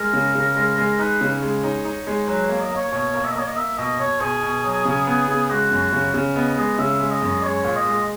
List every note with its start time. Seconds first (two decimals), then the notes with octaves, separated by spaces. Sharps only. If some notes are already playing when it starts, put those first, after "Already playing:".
Already playing: G#3 A#4
0.13 C#3
0.35 C#3
0.56 G#3
0.78 G#3
0.99 D#4 B4
1.21 C#3
1.32 C#5
1.42 G#3
1.63 D#4 C#5
1.85 D#4
2.07 G#3
2.28 F#3 B4
2.44 C#5
2.49 A#3
2.61 D#5
2.71 A#3 C#5
2.92 B2 C#5
3.14 A#3
3.24 E5
3.32 D#5
3.35 A#3 C#5
3.46 D#5
3.57 A#3 E5
3.78 B2 D#5
4.00 B2 C#5
4.21 B2 G#4
4.43 B2
4.64 F#3
4.85 C#3
5.07 B3
5.28 C#3
5.50 G#3 F#4
5.71 F#2
5.93 C#3
6.14 C#3
6.35 B3 D#5
6.58 G#3 D#5
6.79 C#3 E5
7.00 G#3
7.11 D#5
7.22 F#2
7.43 G#3 C#5
7.64 A#2
7.76 D#5
7.85 G#3